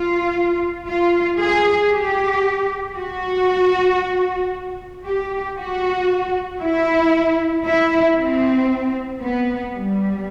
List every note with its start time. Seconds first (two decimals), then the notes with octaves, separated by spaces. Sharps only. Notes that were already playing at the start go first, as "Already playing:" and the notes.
Already playing: F4
0.88 F4
1.39 G#4
1.92 G4
2.96 F#4
5.05 G4
5.57 F#4
6.62 E4
7.66 E4
8.18 C4
9.22 B3
9.75 G3